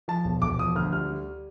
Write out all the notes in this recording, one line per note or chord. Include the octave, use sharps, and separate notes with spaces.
F3 A5
E1
E1 D6
F3 D#6
D2 F6
G3 F6
G3